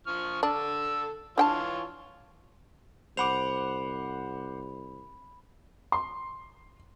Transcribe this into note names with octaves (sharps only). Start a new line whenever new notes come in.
F3 C#6 F6
D3 D4 A4 E6
E3 D4 F4 C#5 G5 A5
C2 C5 F#5 B5 D6 F7
C6